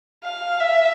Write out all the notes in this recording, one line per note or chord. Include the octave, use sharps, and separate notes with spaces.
F5
E5